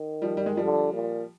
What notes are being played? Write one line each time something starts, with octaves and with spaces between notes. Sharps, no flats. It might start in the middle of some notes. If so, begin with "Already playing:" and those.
Already playing: D#3
F3 G3
G3
G#3
F3 G3
D3
A#2